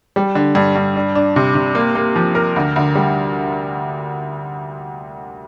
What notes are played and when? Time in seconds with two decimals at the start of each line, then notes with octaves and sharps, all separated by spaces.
0.16 G3
0.35 D3
0.55 G2
0.76 G2
0.96 D4
1.15 D4
1.36 C3
1.55 C3
1.75 A#3
1.95 A#3
2.16 F3
2.35 A#4
2.56 D2
2.76 D2
2.95 G3